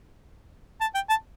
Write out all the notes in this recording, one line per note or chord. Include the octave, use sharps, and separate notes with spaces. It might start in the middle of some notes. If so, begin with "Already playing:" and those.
A5
G5
A5